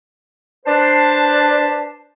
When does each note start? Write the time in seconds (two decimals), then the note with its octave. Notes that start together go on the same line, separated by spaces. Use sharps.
0.66 D4 B4 C5 A5